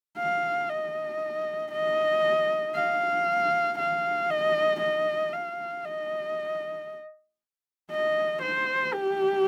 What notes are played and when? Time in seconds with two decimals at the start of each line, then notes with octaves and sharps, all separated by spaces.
0.18 F5
0.69 D#5
1.72 D#5
2.75 F5
3.79 F5
4.31 D#5
4.81 D#5
5.33 F5
5.85 D#5
7.91 D#5
8.43 C5
8.94 G4